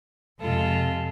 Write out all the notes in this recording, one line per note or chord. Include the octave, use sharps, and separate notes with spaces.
F2 C3 G#3 F4 A4